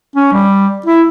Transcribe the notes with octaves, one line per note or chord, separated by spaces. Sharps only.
C#4
G3
E4